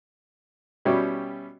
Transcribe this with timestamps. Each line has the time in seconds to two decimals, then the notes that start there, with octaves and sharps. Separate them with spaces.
0.85 B2 G3 C#4 E4 G4